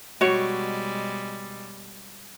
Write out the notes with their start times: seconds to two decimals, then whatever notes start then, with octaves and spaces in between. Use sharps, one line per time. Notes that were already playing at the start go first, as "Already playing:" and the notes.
0.21 B2 G3 G#3 F#4 C#5